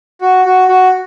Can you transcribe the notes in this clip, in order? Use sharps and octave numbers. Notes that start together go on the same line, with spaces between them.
F#4
F#4
F#4